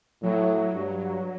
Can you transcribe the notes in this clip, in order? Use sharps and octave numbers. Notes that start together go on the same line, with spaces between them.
A2 F#3
G2